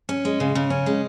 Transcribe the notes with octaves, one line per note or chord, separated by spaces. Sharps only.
C#4
G#3
C#3
C#3
C#4
G#3